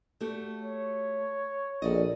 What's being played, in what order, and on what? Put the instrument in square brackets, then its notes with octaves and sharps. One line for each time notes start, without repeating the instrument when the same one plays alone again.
[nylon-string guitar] A3 F#4 G4
[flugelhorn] C#5
[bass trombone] A#1 [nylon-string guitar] A4 D5 D#5